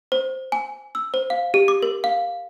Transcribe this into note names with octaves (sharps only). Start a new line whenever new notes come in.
C5
G#5
E6
C5
F5
G4
D6
A#4
F5